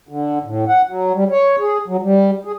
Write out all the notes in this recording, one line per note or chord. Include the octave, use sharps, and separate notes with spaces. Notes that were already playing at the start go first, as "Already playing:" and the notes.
D3
A2
F#5
F#3
G3
C#5
G#4
F#3
G3
G#4